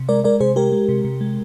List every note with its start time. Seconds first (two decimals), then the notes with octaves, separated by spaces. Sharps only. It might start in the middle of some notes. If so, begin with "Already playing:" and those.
Already playing: C3
0.09 G#3 A#4 D5
0.24 G#3 A#4 D5
0.40 C3 G#4 C5
0.56 G#3 G4 A#4
0.72 G#3
0.89 C3
1.05 C3
1.21 G#3